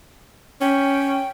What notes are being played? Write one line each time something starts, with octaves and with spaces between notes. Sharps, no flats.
C#4 G5